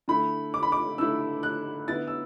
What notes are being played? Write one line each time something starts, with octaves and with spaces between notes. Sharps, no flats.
D3 A3 E4 B5
D6
B5
D6
D3 A3 E4 E6
F#6
D3 B3 E4 A6
E6